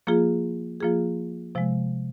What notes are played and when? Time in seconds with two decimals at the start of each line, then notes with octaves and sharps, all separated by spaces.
0.07 F3 A#3 F4 G#4
0.80 F3 A#3 F4 G#4
1.55 C3 F3 G#3